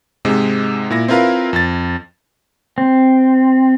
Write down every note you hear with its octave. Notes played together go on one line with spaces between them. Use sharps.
G#2 C3 G#3 D#4
A#2 E4 A#6
C4 E4 F4 A#4 B4 F5
F2 A6
C4